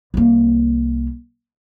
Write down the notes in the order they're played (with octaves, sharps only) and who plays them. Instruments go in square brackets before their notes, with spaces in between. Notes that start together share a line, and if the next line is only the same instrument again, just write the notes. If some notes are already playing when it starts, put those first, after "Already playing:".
[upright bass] C2 A#3